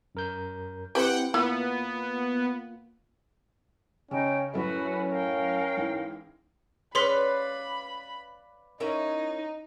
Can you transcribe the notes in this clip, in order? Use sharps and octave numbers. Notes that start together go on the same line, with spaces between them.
F#2 A#4 G6
C4 E4 G4 B4 C5 F#5 G5
A#3 B3 E4 F4
C#3 C#4 D#4 G5
F#2 A2 A3 C#4 F#4 B4
A#4 F5 G5
G#2 E3
C#4 G#4 B4 D5 F5 B5 C6 B6
C#4 D#4 E4 A#4